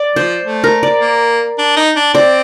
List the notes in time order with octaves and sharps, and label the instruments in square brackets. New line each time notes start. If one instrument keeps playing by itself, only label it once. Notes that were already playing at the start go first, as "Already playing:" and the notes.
Already playing: [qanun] D5
[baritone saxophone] F3 [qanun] C5
[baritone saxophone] A3
[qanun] A#4
D5
[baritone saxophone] A#3
D4
D#4
D4
[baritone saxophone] C4 [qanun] D5